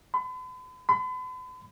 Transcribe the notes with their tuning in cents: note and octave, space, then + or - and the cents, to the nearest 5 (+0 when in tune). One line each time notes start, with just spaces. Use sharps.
B5 +45
B5 +45